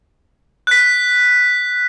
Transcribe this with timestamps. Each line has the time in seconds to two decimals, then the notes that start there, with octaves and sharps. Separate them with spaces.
0.67 F#6 B6